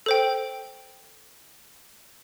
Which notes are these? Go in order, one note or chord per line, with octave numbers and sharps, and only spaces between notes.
A4 C5 G5